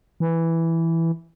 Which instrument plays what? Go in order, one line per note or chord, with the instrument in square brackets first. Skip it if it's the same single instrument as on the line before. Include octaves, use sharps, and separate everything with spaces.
[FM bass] E3